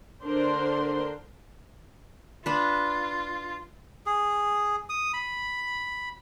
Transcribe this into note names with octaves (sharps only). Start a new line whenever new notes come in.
D3 D4 A#4 C5 C6
D4 F4 B4
G#4
D#6
B5